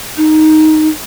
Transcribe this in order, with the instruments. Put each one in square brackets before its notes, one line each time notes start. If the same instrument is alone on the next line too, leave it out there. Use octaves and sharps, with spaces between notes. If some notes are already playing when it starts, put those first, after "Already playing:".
[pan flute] D#4